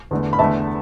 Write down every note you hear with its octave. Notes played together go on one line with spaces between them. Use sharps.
E2 D3 A3
B5
E2 D3 A3 E5 A5